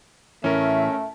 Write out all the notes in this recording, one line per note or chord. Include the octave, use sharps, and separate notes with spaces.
A2 E3 A3 C#4 A#4 E5